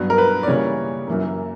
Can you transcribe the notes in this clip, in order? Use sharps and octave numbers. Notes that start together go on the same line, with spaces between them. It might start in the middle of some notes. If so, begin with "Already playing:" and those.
Already playing: G2 F#3 B3
A#4
B4
D5
C#3 E3 G3 A#3 C#5
F#2 E3 A#3